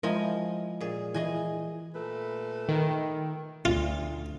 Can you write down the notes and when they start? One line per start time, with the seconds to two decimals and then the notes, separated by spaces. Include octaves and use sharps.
0.03 F3 G#3 E4 A#4 D#5 G#5
0.80 A#2 G#4
1.14 E3 E4 G#4 D#5 G#5
1.95 A#2 A3 B4
2.69 D#3
3.65 D2 F4